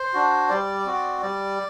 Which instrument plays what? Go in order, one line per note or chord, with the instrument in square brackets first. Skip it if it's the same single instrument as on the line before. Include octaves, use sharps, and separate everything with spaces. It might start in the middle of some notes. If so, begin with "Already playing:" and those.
Already playing: [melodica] C5
D4 F#4
G3 D5
C4 F#4
G3 D5